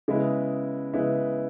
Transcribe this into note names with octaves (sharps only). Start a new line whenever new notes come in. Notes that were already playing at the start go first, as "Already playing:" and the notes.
C#3 G#3 B3 E4
C#3 G#3 B3 E4